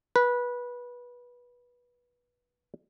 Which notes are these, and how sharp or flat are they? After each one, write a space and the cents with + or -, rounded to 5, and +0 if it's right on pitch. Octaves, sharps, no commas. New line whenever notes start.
B4 -20